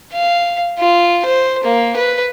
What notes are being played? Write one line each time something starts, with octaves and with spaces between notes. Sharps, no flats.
F5
F4
C5
A#3
B4